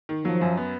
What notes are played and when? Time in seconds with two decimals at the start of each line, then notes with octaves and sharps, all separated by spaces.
0.09 D#3
0.25 F3 F#3
0.41 F#2
0.57 B3